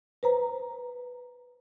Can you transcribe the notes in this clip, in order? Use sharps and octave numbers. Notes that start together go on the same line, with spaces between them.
B4 C5 A#5